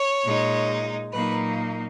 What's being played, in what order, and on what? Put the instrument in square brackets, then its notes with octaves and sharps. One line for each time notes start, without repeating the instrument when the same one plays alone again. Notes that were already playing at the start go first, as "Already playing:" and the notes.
Already playing: [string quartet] C#5
A#2 G#3 D#4
A#2 F#3 A#3 D#4 B4